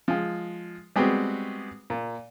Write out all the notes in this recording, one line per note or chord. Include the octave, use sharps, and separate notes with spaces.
F3 G#3
G3 G#3 B3 C4 F#4
A#2